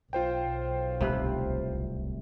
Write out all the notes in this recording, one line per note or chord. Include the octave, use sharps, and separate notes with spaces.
B1 F4 C5 G5
D1 C2 C3 A3 B4